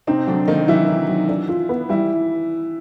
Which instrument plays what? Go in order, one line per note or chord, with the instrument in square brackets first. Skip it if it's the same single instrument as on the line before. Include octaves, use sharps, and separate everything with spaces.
[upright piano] C3 C4 [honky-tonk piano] D#4
[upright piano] D3 D4 [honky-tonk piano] F#3
[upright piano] D#3 D#4 [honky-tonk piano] A#3
[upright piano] E3 E4 [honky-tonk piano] F#3
[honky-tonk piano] D#4
F#3
D4
F4
B3
[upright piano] E3 E4 [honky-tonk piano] G3